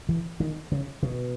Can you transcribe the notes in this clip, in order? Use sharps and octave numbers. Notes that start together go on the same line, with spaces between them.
E3
D#3
C#3
B2